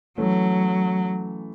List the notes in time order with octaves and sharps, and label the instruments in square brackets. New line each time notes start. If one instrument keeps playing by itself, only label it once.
[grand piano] E3 A3 C#4 [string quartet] F#3